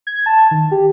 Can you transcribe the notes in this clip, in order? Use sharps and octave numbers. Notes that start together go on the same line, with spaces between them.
G#6
A5
D#3
G4